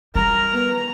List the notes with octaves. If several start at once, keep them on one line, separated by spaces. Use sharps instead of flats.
D#3 G3 A#4 A#5
B3